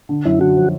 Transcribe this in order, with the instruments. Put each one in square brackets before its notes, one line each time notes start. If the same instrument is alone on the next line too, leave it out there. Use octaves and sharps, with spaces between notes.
[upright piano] D3
[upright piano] F#2 [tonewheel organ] E4
[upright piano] D3 [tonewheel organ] F#4
[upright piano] F3